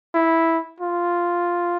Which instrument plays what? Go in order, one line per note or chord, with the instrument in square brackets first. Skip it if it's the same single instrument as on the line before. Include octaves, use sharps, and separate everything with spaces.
[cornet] E4
F4